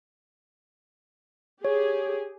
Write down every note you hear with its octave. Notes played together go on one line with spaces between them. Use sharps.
G4 G#4 C#5